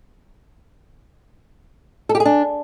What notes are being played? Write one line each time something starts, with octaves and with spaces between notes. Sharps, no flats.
A4
G4
G#4
D4